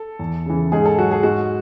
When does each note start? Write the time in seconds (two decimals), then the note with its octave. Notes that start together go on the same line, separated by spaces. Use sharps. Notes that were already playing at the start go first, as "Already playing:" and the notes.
Already playing: A4
0.19 E2
0.46 C#3 E3
0.72 G#2 G#4
0.85 A4
0.98 F#3 F#4
1.12 G#4
1.23 G#2 F#4